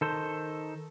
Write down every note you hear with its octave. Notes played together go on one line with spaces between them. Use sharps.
D#3 A4 C5